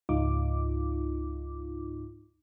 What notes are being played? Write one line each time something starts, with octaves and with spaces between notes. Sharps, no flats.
C#2 G#2 D#4 F4 D6